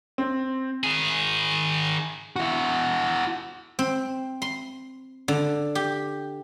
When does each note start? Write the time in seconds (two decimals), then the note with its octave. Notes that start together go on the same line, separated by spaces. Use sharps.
0.18 C4
0.84 D#3 G#4
2.36 E4 F#4
3.79 C4
4.42 C6
5.28 D3
5.75 G4